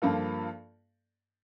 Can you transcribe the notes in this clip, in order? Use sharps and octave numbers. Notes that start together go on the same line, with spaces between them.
G2 F3 A#3 F4 A4